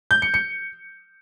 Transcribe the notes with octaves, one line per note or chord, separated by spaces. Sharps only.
G6
C#7
C#7